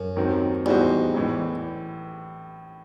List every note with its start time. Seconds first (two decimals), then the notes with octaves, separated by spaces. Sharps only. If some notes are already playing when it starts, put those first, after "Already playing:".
Already playing: F#2
0.16 D#2 D#3 F#3 C4
0.66 E2 A2 G3 D#4 F#4 C5
1.14 A1 A2 E3